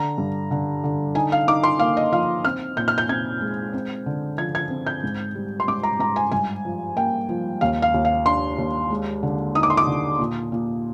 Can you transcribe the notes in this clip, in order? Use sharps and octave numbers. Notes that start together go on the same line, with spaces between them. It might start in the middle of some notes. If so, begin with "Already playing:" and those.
Already playing: D3 A#5
G2
D3
D3
D#4 G#5
F5
D#4 D6
C6
A#3 F5
D#5
F3 F5
C4 F6
A#2 G6
F6
G6
C4 G#6
G#3
C4
D3
F3 G#6
G#6
C4
G6
G#2
G3
C6
G#2 D6
A#5
G#2 A#5
G#5
G2 G#5
F3
A#3 G5
F3
D#2 F5
F5
D#2
F5
D4 C6
D#2
G#3
D3
D#4 D#6
D6
C6
D6
D3
A#2
A#2